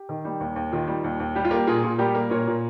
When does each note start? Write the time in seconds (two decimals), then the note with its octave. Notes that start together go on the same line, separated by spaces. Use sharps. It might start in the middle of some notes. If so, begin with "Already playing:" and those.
Already playing: G4
0.09 D#3
0.25 G3
0.40 D#2
0.56 D#2
0.72 D#3 F4
0.88 G3
1.04 D#2
1.20 D#2
1.35 G3 G4
1.45 F4
1.51 A#3 G4
1.67 A#2 F4 G#4
1.84 A#2
1.98 G3 G4 A#4
2.15 A#3
2.30 A#2 A#4 C#5
2.47 A#2